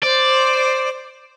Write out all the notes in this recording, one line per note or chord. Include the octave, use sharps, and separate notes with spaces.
C5 D5